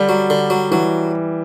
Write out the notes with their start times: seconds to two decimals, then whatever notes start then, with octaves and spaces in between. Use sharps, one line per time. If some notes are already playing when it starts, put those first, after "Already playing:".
Already playing: D3 G3
0.09 F#3
0.30 D3
0.50 F#3
0.71 E3 F#3